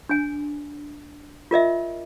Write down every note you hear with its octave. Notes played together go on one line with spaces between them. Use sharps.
D4 G#5
F4 A#4 D#5 E5